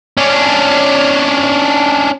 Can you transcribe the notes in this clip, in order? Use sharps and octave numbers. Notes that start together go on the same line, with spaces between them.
C#4 D4